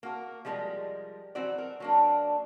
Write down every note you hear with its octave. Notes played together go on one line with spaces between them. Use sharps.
A#3 F#4 A#4
F3 G3 G#3 A4 A#4 D#5
E3 F#3 C4 F#4 D5
A#4
F#3 A#3 D4